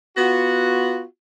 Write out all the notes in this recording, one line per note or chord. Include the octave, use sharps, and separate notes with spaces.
B3 F4 F#4